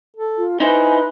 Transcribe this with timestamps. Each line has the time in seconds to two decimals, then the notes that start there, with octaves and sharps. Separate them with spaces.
0.16 A4
0.37 F4
0.60 D#4 E4 B4 C5 G#5